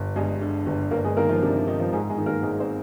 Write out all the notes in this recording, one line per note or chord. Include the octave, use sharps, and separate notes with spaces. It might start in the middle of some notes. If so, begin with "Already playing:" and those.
Already playing: G1
G2 G#3 G#4
D3
G1
G1 A#3 A#4
G#3 G#4
D#3 A#3 A#4
F3 F4
C3 D4
D4
D#3 D#4
F3 F4
G#2 G#3 G#4
G#3 G#4
D#3
A#3 A#4
G#1 G#3 G#4
C4 C5